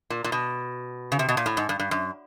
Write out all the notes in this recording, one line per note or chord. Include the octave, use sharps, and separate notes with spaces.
A#2
A#2
B2
C#3
C3
B2
A#2
A2
G#2
G2
G2
F#2